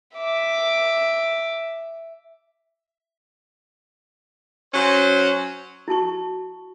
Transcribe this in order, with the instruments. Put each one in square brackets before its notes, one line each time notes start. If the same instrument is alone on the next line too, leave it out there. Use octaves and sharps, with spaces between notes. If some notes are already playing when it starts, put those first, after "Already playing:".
[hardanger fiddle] E5 D6
[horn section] F#3 C#4 C5
[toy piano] E4 F#4 A5 C#6